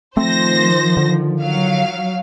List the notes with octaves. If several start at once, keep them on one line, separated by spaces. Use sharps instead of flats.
D#3 F3 A3 C4 C5 A#6
D3
F#3 F5